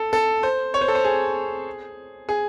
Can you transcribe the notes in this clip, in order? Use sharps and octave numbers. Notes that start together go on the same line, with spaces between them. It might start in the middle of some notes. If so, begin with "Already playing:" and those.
Already playing: A4
A4
C5
C#5
C5
A4
C5
G#4
G#4